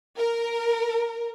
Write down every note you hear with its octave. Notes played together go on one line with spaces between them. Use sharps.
A#4